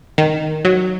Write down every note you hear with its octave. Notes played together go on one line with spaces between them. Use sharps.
D#3
F#3